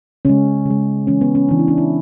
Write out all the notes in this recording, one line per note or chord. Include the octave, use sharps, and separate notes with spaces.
C#3 G#3 C#4
C#3 G#3
C#3 E3 G#3 C#4
B3
C#4
C#3 E3 G#3 D4
E4
D4
E4